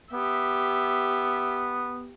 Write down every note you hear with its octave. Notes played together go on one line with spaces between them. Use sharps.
B3 G4 E5